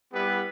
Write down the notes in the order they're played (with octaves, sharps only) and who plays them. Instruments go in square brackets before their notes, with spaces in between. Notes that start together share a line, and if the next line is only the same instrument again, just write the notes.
[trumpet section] G3 B3 E4 G4 B4